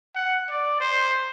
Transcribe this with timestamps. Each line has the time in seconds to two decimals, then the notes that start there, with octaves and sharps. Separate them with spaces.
0.15 F#5
0.49 D5
0.80 C5